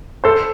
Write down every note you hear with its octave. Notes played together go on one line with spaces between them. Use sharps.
A4 C5